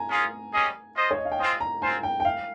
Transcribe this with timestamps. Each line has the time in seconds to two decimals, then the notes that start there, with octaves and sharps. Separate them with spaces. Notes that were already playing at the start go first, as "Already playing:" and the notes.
Already playing: G#5 A#5
0.10 C#4 F4 G#4
0.53 G3 C#4 G#4 D#5
0.96 F4 C5 D#5
1.11 C#5
1.18 D#5
1.25 F5
1.32 G5
1.39 C4 F4 C5 D#5 G#5
1.60 A#5
1.81 C4 F4 C5 G#5
2.03 G5
2.20 G5
2.25 F5